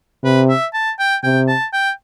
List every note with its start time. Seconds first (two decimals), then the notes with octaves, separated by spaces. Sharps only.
0.23 C3 B4
0.49 E5
0.73 A5
0.99 G5
1.23 C3 G5
1.48 A5
1.73 G5